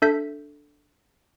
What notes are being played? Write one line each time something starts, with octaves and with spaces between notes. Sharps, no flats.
D4 A4 E5 G6 B6